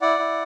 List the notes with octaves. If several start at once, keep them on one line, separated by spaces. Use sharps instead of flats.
E4 D5 F#5
E4